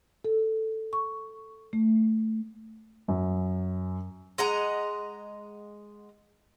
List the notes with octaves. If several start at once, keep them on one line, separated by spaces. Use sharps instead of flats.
A4
C#6
A3
F#2
G#3 D#5 F#5 A#5